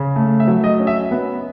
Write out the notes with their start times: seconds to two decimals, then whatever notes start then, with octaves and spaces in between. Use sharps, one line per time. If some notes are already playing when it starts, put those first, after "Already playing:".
Already playing: C#3
0.16 A3
0.40 E5
0.47 F#3
0.64 D#5
0.79 C#4
0.87 E5
1.11 B3